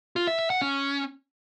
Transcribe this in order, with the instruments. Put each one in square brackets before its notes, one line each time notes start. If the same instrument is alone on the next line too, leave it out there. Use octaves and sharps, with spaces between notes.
[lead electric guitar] F4
E5
E5
F#5
C#4